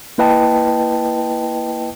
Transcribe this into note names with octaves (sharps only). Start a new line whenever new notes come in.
A#3 E4 B4 D#5 G5 A5